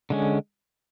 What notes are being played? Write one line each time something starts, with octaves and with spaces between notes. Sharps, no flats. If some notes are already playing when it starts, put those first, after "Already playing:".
D3 G#3 C#4